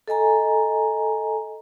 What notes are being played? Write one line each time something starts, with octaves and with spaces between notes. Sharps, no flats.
A4 D#5 G#5 A#5